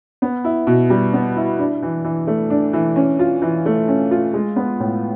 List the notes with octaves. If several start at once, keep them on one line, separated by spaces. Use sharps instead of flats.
B3
E4
B2
G3
B3
E4
D4
E3
E3
A3
D4
E3
C#4
F4
E3
A3
C#4
F4
G#3
B3
A2